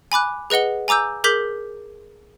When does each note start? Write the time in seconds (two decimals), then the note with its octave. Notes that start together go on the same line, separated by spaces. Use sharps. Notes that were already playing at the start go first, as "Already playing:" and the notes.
0.12 G#5 B5 D6 F#6
0.50 G#4 B4 D#5 F#5 G7
0.88 G#5 A#5 D6 E6 G6
1.24 G#4 A#4 D6 G6 B6 F#7